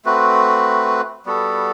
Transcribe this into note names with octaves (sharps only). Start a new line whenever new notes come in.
A3 C4 F#4 B4
G3 B3 F#4 A4